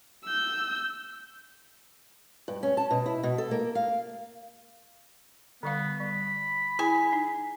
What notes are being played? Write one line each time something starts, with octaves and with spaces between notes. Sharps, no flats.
E6 G6
G2
C#4
A5
B2
E4
B2
A4
A#3
F5
D3 G3 B3 F5
G3 B5
E4 G#4 G#5
D#4